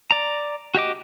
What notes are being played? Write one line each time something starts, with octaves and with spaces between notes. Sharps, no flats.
D5 A#5
F#4 G4 D#5 D6